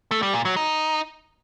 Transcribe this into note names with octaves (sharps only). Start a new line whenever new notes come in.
A3
G3
A#2
F#3
D#4